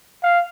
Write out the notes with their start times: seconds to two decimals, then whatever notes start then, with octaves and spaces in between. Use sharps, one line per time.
0.23 F5